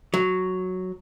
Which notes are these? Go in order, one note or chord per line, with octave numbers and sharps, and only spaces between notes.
F#3